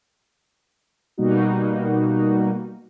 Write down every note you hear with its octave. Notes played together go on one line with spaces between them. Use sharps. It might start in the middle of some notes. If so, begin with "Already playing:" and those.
B2 G3 A#3 D#4 F#4